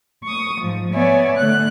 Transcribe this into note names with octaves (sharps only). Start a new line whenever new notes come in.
C#6 D#6
G#2 F3
B3 C#5 D5 E5 G#5
D3 A3 F#6